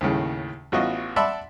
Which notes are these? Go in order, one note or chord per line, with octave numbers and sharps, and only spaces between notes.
D#2 A2 C#3
A1 B3 F4 F#4 D#5
D5 E5 F#5 A5 B5 C6